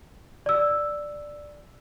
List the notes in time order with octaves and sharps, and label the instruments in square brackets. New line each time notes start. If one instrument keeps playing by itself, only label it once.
[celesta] D5 E6